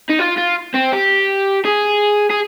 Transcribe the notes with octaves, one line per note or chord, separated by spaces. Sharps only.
D#4
F4
F4
C4
G4
G#4
G#4